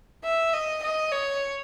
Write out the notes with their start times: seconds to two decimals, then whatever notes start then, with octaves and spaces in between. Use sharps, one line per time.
0.24 E5
0.53 D#5
0.83 D#5
1.12 C#5